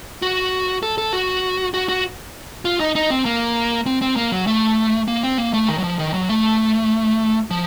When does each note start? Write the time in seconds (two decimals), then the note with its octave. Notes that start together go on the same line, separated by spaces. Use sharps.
0.22 F#4
0.83 A4
0.98 A4
1.13 F#4
1.74 F#4
1.89 F#4
2.65 F4
2.80 D#4
2.95 D#4
3.10 C4
3.25 A#3
3.86 C4
4.02 C4
4.16 A#3
4.32 F#3
4.47 A3
5.08 A#3
5.23 C4
5.38 A#3
5.53 A3
5.68 D#3
5.78 F#3
5.84 F3
5.99 D#3
6.14 F#3
6.29 A3
7.51 F3